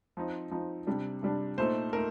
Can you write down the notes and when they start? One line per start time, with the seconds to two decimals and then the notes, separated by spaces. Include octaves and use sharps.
0.17 F3 C4 D#4
0.51 F3 C4 D#4
0.87 C3 G3 D4
1.23 C3 G3 D4
1.58 A#2 A3 D#4 C5
1.93 A3 D#4 A#4